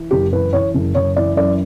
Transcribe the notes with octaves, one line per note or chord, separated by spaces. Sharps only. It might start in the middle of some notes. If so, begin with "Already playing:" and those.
Already playing: E3
F#1 G4
E3 B4
E3 C#5
F#1
F#1 C#5
E3 D5
F#2 D5